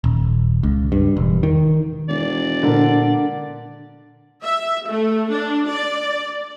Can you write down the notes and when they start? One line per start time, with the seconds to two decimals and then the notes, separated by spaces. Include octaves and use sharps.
0.04 D#1
0.63 C#2
0.92 G2
1.17 E1
1.43 D#3
2.09 E1 D5
2.63 A#2 D3 A#4 A6
4.43 E5
4.88 A3
5.31 D4
5.69 D5